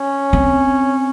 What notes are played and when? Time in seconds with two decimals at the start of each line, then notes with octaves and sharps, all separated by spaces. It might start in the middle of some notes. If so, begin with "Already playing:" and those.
Already playing: C#4
0.33 C4